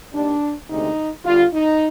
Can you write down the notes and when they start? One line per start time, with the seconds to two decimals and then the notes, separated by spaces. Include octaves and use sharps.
0.13 D#2 D#3 G3 D4
0.69 D2 C3 D#3 G#3 D#4
1.25 G1 G2 D3 G3 F4
1.52 D#4